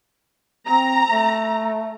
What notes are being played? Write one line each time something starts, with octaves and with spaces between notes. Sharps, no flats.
C4 A#5
A3